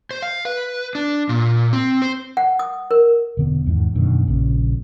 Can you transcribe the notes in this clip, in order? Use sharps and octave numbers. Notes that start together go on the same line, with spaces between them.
C5
F5
B4
D4
A#2
C4
C5
F#5
D#6
A#4
E1 D3 B3
E2 G#2 D#3
F#2 B2 D3 D#3
A#1 A#2 C#3